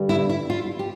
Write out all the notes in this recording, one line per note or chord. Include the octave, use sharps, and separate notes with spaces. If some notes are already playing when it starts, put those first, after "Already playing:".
Already playing: G2 D3 G3
E4
E4
F4
G4